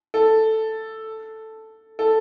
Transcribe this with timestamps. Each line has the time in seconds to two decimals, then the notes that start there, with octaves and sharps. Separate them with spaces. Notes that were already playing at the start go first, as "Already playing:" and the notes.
0.14 A4
1.99 A4